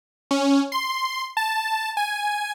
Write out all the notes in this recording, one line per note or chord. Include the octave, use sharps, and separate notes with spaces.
C#4
C6
A5
G#5